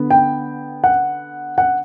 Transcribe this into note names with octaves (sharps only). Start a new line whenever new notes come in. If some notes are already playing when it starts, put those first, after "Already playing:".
Already playing: D3 B3
G5
F#5
F#5